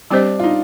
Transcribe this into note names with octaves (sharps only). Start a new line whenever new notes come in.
G3 C4 D4 G4 C5 D#5
F4
D#4